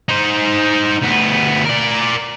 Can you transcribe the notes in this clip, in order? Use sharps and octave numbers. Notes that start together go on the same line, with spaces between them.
D#4 C5
D2 B3
A#4 D5